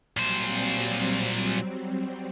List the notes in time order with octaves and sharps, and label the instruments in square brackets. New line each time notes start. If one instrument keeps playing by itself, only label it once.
[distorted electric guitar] A#2 C5 [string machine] F#3 G3 C4